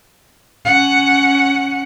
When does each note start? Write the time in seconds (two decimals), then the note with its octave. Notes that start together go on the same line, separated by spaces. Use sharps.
0.65 C#4 F#5